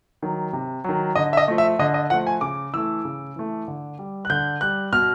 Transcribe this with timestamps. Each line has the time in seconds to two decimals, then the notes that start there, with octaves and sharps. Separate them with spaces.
0.22 D#3 F#3
0.53 C3
0.84 D#3 F#3
1.15 D3 D#5
1.33 E5
1.37 D#5
1.48 F3 A3
1.58 E5
1.79 D3 D#5
1.94 D#5
2.10 F3 A3 F#5
2.27 G#5
2.41 C#3 D6
2.74 E3 A3 E6
3.05 C#3
3.36 E3 A3
3.68 D3
3.99 G3
4.25 F#6
4.30 D3 G6
4.61 G3 F#6
4.92 B2 F6